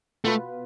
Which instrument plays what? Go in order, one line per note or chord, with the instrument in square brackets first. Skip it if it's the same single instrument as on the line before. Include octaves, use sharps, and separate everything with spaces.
[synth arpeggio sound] B2 B3 F4 B4 [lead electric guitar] A3